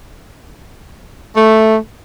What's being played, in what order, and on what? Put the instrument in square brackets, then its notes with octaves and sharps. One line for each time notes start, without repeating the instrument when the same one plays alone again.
[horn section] A3